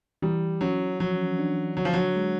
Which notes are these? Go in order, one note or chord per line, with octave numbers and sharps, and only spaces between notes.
E3 G3
F#3 C#4
F3 F#3
D4
D3 F#3
F3
F#3
G#3